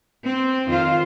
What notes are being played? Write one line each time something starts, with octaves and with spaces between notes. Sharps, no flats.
C4
F2 D#3 F4 C5 F5